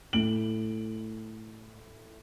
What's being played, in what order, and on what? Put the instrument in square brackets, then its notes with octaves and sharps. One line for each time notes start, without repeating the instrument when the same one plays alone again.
[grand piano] A2 D7 F#7